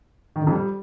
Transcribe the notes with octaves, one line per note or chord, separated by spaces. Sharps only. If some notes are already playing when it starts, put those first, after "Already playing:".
D#3
D3
F2
G3